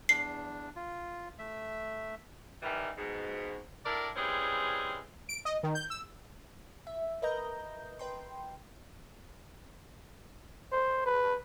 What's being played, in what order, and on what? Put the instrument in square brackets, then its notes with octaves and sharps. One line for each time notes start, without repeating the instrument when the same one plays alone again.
[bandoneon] E2 D4 [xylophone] C7
[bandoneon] F4
A3 E5
[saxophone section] D#3 E3 G3
G#2 B2
A2 D4 E4 A#4 D5
E3 G3 G#3 C4 C#4 G#4
[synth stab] D7
D#5
D#3
G6
E6
[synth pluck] E5
A#4 B4 D#5 A#5 G6
B4 G5 C6
[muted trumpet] C5
B4